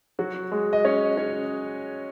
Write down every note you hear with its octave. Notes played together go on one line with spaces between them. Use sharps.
F#3 F#4
G#3 G#4
D#5
C#4 C#5
C#4 C#5